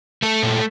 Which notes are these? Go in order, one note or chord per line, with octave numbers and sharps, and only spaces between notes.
A3 A4
A#2